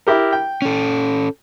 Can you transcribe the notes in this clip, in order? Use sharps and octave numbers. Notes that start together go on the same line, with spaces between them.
E4 G4 A#4
G5
C#4 A4